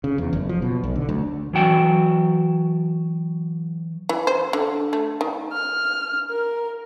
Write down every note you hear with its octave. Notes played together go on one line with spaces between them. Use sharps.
C#3
E2
F#1
F3
B2
B1
D3
D2
E3 F#3 G5 A5
E3
C5
D3
A3
D#3
F6
A#4